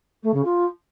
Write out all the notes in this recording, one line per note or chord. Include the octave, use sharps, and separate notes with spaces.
A3
C#3
F4